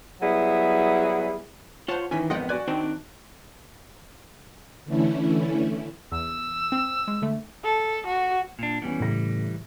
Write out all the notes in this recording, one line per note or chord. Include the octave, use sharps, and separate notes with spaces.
F#3 G3 B3 E4 G#4
F4 C5 C#5 F#5 A5
D#3 E3 C#4 G#5 B6
G#1 F2 B3 D#5 F#5 G5
F#4 D5 G#5 F#6
D#3 C4 D4 D#4
D3 E3 A3 C#4 E4
E2 E6
C4
G#3
D3 A3
A4
F#4
A#2 D4
E3 G3 B3 C#4
A2 C#3 A#6